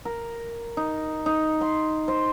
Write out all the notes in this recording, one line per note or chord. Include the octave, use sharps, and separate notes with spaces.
A#4
D#4
D#4
C6
C5